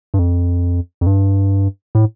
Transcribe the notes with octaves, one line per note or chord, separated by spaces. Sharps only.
G2
F2
F2
G2
A2